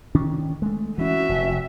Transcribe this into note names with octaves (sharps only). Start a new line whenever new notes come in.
D#3 C#4 D4
G#3 A3
E3 C#4 F#4 E5
F1